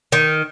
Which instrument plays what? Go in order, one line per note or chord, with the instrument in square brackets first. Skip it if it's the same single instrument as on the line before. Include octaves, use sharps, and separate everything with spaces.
[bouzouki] D#3